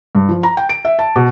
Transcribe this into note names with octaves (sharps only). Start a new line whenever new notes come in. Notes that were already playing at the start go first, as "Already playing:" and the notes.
G2
F3
A#5
G5
D7
E5
A5
B2